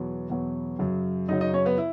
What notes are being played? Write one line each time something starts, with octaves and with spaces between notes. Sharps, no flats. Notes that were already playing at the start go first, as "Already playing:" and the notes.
Already playing: E2 B2 F#3
E2 B2 F#3
F#2 C#3 F#3
F#2 C#3 F#3 D#4 D#5
D#4 D#5
C#4 C#5
B3 B4
E4